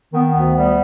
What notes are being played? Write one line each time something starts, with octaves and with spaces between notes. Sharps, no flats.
D#3 B3
B3
D2
G3 B3